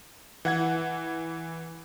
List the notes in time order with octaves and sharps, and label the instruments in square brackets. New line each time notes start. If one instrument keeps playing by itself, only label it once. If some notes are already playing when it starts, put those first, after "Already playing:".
[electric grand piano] E3 F#5 G#6